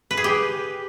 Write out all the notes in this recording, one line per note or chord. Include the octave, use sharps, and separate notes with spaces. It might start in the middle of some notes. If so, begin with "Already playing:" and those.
B4
G#4
G4